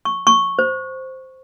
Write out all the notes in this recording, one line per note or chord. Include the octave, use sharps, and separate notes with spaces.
C#6
C#6
C5